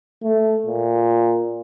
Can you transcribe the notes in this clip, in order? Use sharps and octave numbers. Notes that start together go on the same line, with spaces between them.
A3
A#2